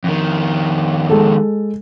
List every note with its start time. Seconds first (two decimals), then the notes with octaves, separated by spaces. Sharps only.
0.04 F2 D#3
1.09 G#3 A4